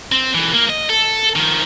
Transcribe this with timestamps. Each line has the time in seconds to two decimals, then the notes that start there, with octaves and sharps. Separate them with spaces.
0.12 C4
0.35 B1 E3
0.54 A#3
0.70 D#5
0.90 A4
1.36 D#3 F3